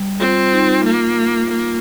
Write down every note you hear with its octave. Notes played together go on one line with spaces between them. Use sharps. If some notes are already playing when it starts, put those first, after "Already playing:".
Already playing: G3
C4 F4
D#4
A#3 F4
A#3